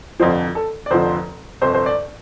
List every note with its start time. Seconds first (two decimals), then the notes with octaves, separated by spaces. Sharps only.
0.20 F1 F2 D3 F3 C5
0.55 A4
0.86 D5
0.90 F1 F2 D3 F3 C5
1.61 G1 F2 C3 C5
1.74 C5
1.86 D5